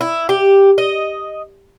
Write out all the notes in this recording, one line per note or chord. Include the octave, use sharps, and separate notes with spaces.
E4
G4
D#5